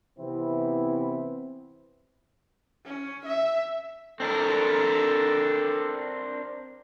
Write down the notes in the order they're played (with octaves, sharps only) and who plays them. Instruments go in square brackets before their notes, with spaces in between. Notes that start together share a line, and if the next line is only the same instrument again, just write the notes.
[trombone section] C3 E3 B3 C4 E4
[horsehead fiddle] C#4
E5
[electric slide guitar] C4 D4 A#4 [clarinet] A4